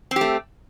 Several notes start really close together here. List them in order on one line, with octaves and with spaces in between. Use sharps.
C4 G4 A3